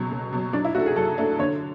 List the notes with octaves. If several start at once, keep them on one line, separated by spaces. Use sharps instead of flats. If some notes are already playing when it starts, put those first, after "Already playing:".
Already playing: C#2 B2 F#3
C#2
B2 F#3
F#3 D4
E4
A3 D4 F#4 A4
G#4
F#3 A4
A3 D4 A4
D3 C#5